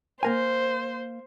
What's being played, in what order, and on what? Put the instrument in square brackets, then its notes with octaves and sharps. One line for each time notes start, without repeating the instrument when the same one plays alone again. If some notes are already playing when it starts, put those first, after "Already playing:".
[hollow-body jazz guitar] A#3 A#4 G#5 [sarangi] C5